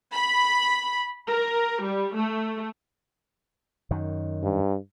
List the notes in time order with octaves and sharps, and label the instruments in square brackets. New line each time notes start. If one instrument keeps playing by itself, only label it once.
[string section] B5
A#4
G3
A3
[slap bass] F#2 D#3
[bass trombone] G2